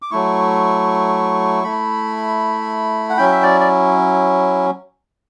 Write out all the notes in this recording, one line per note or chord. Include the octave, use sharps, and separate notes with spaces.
D6
F#3 A3 E4 C#6
A3 E4 B5
F#5
F#3 C#4 E4 G5
E5
D5
D5